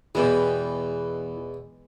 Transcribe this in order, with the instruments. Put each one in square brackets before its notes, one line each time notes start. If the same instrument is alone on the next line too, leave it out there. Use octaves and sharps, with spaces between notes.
[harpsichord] E2 B2 [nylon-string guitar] E3 [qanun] G#3 B3 G4